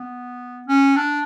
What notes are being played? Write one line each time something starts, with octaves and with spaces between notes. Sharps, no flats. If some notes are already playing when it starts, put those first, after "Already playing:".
Already playing: B3
C#4
D4